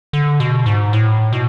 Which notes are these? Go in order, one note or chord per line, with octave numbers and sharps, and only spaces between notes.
D3
B2
G#2
A2
B2